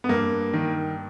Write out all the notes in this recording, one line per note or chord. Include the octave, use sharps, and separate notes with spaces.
B3
G2 A#3
D#3